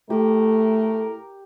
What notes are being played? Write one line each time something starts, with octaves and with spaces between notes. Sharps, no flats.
A2 A3 G4 A#4